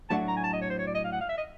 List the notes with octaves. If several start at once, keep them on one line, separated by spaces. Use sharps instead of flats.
A2 F#3 A3 D4 F#4 A5
A#5
G#5
A5
D#5
C#5
C5
C#5
D5
D#5
F5
F#5
F5
E5
D#5